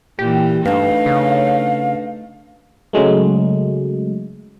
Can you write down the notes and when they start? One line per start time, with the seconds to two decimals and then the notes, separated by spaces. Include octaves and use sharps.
0.19 A#2 E3 G4
0.66 G2 A3 D4 D#4 B4 F5
1.06 C#3
2.93 C#3 F#3 G#3 A3